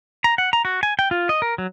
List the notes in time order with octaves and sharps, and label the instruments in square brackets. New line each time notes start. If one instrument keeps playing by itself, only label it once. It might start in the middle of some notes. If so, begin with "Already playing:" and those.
[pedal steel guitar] A#5
F#5
A#5
F#4
G#5
G5
F4
D#5
A#4
F#3